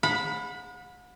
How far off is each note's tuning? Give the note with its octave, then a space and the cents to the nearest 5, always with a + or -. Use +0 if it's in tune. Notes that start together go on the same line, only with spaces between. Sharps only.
F#5 -40 B5 +0